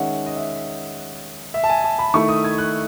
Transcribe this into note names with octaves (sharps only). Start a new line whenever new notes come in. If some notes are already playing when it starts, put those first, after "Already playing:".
Already playing: D#3 G#3 C#4 E5 F#5
D#5
E5
E5
A5
G#5
A5
B5
D#3 A3 E4 C#6
D#6
G#6
F#6